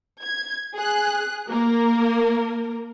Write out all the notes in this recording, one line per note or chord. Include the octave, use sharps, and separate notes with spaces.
G#6
G#4 F#6
A#3 A#4